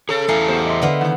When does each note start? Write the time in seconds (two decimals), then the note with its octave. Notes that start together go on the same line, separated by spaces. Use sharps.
0.09 G#4 A4 C#5
0.28 E2 A3 C#4 E4 G#4 F5 A#5 C7
0.48 B3 G4 C5
0.67 D#5 E5 C6
0.82 D3 B3 F5
1.01 D#3 F#5